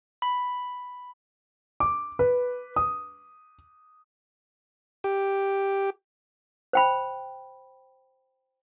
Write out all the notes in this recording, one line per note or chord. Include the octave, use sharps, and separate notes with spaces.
B5
D6
B4
D#6
G4
C5 G5 B5